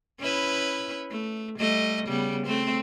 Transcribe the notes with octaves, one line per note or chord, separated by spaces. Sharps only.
C#4 E4 B4
A3
G3 A3 D#5
C#3 G3 B3
A3 C4 C5